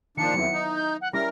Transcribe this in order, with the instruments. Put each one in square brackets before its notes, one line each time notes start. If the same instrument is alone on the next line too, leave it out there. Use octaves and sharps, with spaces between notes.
[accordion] A#2 F3 D4 [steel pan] D#3 [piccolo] C#7
[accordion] F2 [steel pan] F#3 B3 E4
[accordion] D#4
[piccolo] G6
F#5
[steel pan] G3 C#4 E4 [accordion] A#4 [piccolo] A#6